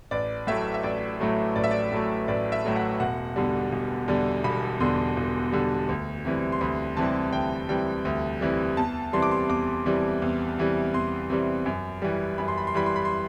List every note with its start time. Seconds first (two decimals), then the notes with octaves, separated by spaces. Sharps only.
0.11 A1 D5
0.47 A2 F#3 A3 E5
0.74 E5
0.83 A1 D5
1.20 A2 F#3 A3
1.56 A1 D5
1.64 E5
1.71 D5
1.92 A2 F#3 A3
2.28 A1 D5
2.52 E5
2.64 A2 F#3 A3
2.76 F#5
3.00 E1 F#5
3.36 E2 D3 G3
3.72 E1
4.08 E2 D3 G3
4.44 E1 B5
4.80 E2 D3 G3 C6
5.17 E1
5.52 E2 D3 G3
5.89 D2
6.25 C3 E3 G3
6.52 C6
6.61 D2 B5
6.97 C3 E3 G3 A5
7.33 D2 G5
7.69 C3 E3 G3 G5
8.05 D2
8.41 C3 E3 G3
8.77 E2 A5
9.13 C3 E3 G3 C6
9.22 D6
9.31 C6
9.49 E2 D6
9.85 C3 E3 G3
10.22 E2
10.58 C3 E3 G3
10.94 E2 C6
11.30 C3 E3 G3
11.66 F#2
12.02 E3 G3
12.38 F#2 B5
12.48 C6
12.58 B5
12.67 C6
12.74 E3 G3 B5
12.86 C6
12.96 B5
13.05 C6